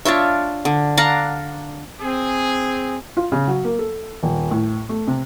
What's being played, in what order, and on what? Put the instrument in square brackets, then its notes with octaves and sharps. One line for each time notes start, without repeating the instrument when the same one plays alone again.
[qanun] D4 F4 C#5 E5
D3
D4 F5 F#5 A#5
[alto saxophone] C4 [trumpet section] G#4
[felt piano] F4
C#3
F#3
A#3
A4
D#1
A2
A3
C3